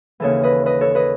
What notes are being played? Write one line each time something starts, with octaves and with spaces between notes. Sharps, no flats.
D#2 C#3 E3 A4 C#5
B4 D#5
B4 D#5
A4 C#5
B4 D#5